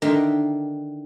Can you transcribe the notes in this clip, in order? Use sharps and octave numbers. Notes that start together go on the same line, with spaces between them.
D3 D#3 A#4 E5 G5 C6